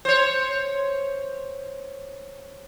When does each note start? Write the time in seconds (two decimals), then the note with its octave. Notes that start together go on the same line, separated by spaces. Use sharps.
0.05 C5 C#5